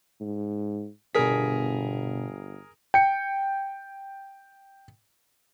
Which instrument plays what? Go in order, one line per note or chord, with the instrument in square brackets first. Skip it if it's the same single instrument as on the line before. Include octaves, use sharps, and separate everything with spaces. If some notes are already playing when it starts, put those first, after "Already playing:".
[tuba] G#2
[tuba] G1 [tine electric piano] B2 D4 B6 [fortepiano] G#4 A#4
[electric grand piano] G5 C#7